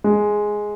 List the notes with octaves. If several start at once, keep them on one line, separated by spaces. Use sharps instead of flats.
G#3